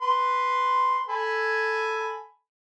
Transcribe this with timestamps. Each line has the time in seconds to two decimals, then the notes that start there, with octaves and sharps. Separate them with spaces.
0.02 B4 C6
1.09 A4 G#5 B5